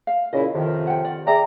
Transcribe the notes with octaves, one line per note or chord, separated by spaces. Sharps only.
F5
A#2 C#3 E4 D#5
F2 C3 D#3
F#5 G5
D5
G#4 D5 E5 G5 A#5